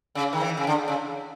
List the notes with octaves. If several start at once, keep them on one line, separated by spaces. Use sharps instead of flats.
C#3
D#3
E3
C#3
D3
C#3